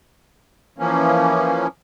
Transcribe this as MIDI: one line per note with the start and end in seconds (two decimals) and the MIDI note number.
0.78 1.67 52
0.78 1.67 53
0.78 1.67 58
0.78 1.67 61